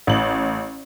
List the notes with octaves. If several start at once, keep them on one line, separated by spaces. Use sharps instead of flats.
A1 F#7